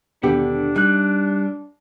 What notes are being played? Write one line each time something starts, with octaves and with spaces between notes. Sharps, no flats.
D#2 B2 D3 B3 D4 G4
G3 D#4 F#6